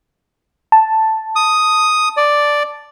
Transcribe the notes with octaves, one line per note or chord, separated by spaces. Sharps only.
A5
D#6
D5